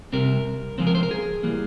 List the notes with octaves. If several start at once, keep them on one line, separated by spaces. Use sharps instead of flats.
C3 G3 C4 A#4
C#3 F3 G#3 C4 C5
A#4
C5
A#4
G#4
E3 G3 A#3